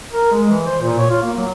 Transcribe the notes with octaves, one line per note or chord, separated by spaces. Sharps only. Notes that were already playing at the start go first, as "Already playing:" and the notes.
A#4
G#3
E3
C5
A#2
C#5
F4
A#3
F#3